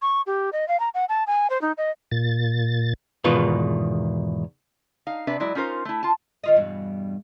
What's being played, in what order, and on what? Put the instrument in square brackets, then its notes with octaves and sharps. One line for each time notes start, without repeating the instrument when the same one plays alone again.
[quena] C#6
G4
D#5
F5
A#5
F#5
A5
G#5
C5
D#4
D#5
[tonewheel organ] A#2 A6
[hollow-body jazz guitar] E2 G#2 B2 D#3 F4 B4
[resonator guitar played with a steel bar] D#4 F5
C3 D4 B4 E5
F#3 G#3 E4 D5
C#4 D#4 F4 A#4 C5
A3 E4
F4 A5
[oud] D#3 F4 D#5
E2 G2 B2